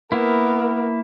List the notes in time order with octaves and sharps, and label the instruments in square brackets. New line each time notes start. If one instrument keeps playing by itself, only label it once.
[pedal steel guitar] A#3 E4 [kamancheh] B3 A#4